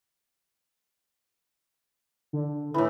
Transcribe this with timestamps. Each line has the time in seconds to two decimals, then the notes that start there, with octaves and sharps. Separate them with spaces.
2.33 D3
2.74 A2 E3